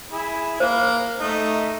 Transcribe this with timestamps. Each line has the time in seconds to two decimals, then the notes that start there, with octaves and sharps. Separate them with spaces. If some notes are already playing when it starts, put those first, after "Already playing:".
0.12 E4 G#4
0.60 A#3 C5 F5
1.20 A3 D#4